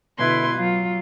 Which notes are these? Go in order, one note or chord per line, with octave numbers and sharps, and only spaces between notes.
B2 D3 E4 B4 C6 G#6
F#3 F4